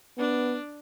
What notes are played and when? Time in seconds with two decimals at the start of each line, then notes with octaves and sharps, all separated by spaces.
0.18 B3 D4